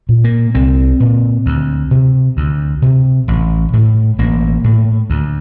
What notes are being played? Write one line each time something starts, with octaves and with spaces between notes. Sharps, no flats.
A#2
A#3
C2 C4
A#2
D2
C3
D2
C3
A1
A2
A1 A#3
A2
D2